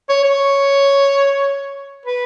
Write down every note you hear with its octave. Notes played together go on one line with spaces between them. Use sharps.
C#5
C#5
B4